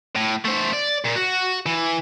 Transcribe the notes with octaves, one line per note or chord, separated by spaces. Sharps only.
A2
A3 C5
D5
A#2
F#4
E3